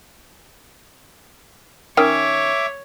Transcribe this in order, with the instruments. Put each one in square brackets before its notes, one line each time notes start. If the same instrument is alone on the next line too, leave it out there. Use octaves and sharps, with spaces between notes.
[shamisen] D#3 C#4 G5 [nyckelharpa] C#5 [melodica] E5 D6